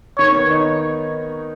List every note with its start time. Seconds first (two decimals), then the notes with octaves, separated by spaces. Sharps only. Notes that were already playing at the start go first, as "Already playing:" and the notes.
0.18 D#3 C#5
0.35 B3
0.50 D#4